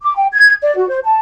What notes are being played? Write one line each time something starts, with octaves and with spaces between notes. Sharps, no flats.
D6
G5
G#6
D5
F#4
C5
A5